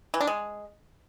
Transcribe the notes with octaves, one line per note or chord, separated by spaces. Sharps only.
E3
D4
G#3